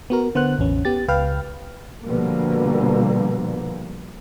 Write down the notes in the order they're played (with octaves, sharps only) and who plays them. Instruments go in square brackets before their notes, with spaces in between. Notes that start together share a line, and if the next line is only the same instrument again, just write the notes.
[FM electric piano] B3 F#4 A#4
D3 B3 C5 F#5 F#6
A1 E2 C#4
B3 G4 A6
C#2 B4 F5 G5 F6
[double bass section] B2 D3 F3 G3 A#3